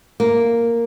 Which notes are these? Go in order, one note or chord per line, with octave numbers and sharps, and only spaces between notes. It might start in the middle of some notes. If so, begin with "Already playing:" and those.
A#3